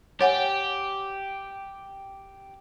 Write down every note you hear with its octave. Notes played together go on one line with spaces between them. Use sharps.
G4 C#5 F#5 G#5